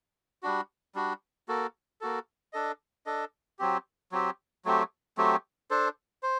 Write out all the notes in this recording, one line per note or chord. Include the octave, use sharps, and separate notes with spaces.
G3 D4 F#4
G3 D4 F#4
A#3 F#4 A4
A#3 F#4 A4
D4 A4 D#5
D4 A4 D#5
F#3 C4 G4
F#3 C4 G4
F#3 A3 C4 G4
F#3 A3 C4 G4
D4 A4 C5
C5